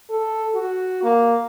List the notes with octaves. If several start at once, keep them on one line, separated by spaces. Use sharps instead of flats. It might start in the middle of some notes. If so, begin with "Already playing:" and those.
A4
F#4
A#3